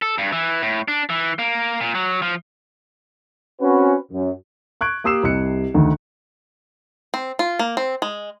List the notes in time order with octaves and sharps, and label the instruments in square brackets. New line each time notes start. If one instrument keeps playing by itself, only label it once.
[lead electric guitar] A4
G2
E3
A2
D4
E3
A#3
A#2
F#3
F3
[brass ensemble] C4 C#4 F#4 B4
F#2
[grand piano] C#6 F#6 G#6 D7
A#3 G4 D#6 E6 C7 E7
C2 C3 D#5 F#6 C#7
D2 D#3
[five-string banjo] C4
F4
A#3
C4
G#3